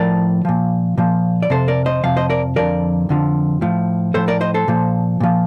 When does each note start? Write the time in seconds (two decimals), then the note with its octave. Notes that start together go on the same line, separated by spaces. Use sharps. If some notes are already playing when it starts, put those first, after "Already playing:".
Already playing: A2 F3 A#4 D5
0.45 A#2 F3
0.98 A#2 F3
1.43 D5
1.50 F2 C3 F3 A4 C5
1.68 A#4 D5
1.86 C5 D#5
2.03 F2 C3 F3 F5
2.16 C5 D#5
2.30 A#4 D5
2.56 F2 D3 F3 A#4 D5
3.09 F2 D3 F3
3.61 A2 F3
4.14 A2 F3 A4 C5
4.28 A#4 D5
4.41 C5 D#5
4.54 A4 C5
4.68 A#2 F3
5.20 A#2 F3